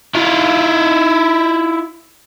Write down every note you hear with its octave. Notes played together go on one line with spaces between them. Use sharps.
E4 F4